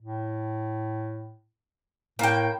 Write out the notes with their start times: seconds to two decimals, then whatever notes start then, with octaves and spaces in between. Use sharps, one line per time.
0.01 A2
2.19 A2 A#3 G5